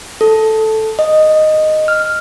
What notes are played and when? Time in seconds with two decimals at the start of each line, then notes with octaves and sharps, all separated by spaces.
0.21 A4
0.99 D#5
1.88 F6